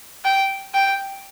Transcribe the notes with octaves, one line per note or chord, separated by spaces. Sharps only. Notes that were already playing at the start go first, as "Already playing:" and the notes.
G5
G5